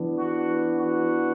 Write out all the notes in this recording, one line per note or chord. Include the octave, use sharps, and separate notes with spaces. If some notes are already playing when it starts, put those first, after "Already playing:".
Already playing: E3 B3 D4
F#4
F#4